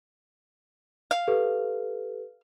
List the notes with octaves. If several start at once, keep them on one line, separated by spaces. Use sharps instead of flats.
F5
G4 A4 B4